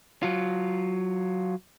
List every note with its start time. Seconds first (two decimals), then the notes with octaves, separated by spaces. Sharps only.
0.23 F#3 F4